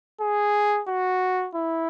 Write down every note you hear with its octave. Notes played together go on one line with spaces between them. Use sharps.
G#4
F#4
E4